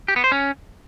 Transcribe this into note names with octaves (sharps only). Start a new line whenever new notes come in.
G4
B3
C5
C#4